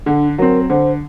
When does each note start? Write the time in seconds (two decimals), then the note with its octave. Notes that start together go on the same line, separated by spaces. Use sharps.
0.06 D3 D4
0.38 F#3 C4 A#4
0.69 D3 C5